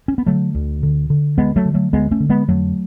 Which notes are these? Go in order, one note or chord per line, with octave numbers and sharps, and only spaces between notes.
C#4
B3
D3 F#3 A3
D2
D3
D3
D2 G#3 B3
F#3 A3
D3
F#3 A3
D2 G#3 B3
A3 C#4
D3
G#3 B3
F2 F#3 A3